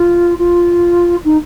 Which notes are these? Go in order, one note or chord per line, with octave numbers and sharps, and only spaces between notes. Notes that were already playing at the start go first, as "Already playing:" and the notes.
Already playing: F4
F4
D#4